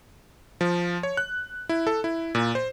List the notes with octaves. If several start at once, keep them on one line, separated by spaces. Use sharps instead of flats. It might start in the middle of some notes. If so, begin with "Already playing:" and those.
F3
C#5
F#6
E4
A4
E4
A#2
C5